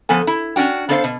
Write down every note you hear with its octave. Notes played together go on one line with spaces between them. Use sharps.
F3 B3 A4 G#5
E4
C#4 D4 F#4 G5
B3 D4 A4 C5 D#5 F5
B2